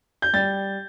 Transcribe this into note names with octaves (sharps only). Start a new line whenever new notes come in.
G6
G3 A6